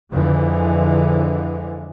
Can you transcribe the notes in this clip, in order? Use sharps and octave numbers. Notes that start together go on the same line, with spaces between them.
F2 D3 E3 F3 G#3